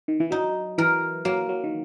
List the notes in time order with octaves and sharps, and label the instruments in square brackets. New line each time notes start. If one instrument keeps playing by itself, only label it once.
[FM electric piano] D#3
E3
[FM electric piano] F#3 [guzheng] D#4
[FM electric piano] E3 [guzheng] A#4
[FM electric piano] F#3 [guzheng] A#3
[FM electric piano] F#3
D#3